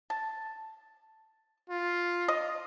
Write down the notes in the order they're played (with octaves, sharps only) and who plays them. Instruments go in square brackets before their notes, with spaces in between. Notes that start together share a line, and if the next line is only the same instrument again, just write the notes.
[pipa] A5
[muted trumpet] F4
[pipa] D#5